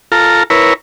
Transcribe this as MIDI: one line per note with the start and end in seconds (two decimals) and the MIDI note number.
0.12 0.43 65
0.12 0.43 69
0.12 0.43 82
0.50 0.74 64
0.50 0.74 70
0.50 0.74 71
0.50 0.74 73